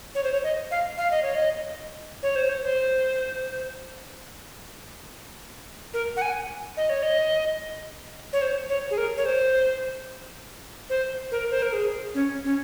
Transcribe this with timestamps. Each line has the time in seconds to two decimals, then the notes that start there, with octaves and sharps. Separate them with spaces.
0.15 C#5
0.24 C5
0.33 C#5
0.44 D#5
0.71 F5
0.98 F5
1.11 D#5
1.22 C#5
1.35 D#5
2.23 C#5
2.36 C5
2.49 C#5
2.63 C5
5.94 A#4
6.17 F#5
6.22 G#5
6.77 D#5
6.90 C#5
7.03 D#5
8.33 C#5
8.42 C5
8.69 C#5
8.91 G#4
8.98 A#4
9.17 C#5
9.26 C5
10.90 C5
11.32 A#4
11.51 C5
11.62 A#4
11.73 G#4
12.14 C#4
12.45 C#4